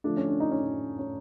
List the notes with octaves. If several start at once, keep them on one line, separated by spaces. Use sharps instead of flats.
D3 F3 A3 D4
C#4
D4
D#4
C#4
D4
C#4